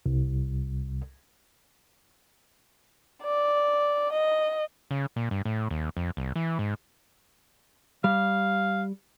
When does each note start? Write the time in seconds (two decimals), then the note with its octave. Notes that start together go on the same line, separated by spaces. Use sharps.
0.06 C2
3.23 D5
4.12 D#5
4.91 C#3
5.16 A#2
5.31 G2
5.45 A2
5.71 D#2
5.97 F2
6.17 C2
6.36 E3
6.59 G#2
8.04 G3 F5